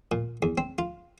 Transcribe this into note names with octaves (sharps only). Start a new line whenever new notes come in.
A#2
E2
C4
F4